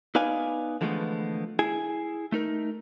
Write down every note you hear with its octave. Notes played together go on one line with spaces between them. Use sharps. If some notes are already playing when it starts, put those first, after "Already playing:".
B3 D#4 B4 D5 F5 G#5
D3 E3 F3 G#3 A3 B3
E4 G#4 G#5
A3 D#4 A#4